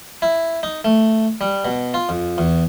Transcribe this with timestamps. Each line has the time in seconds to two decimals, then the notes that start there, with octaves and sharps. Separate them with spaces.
0.22 E4
0.63 D#4
0.84 A3
1.41 G3
1.65 B2
1.94 F4
2.09 F2
2.38 E2